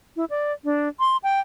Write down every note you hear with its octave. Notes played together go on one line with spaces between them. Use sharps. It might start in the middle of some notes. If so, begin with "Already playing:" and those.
E4
D5
D4
C6
G5